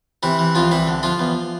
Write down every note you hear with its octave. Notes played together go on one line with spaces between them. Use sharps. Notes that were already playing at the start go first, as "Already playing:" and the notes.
C3 E3 E4
E3
C2 F3 F4
C2 E3 E4
D3
F3 F4
E2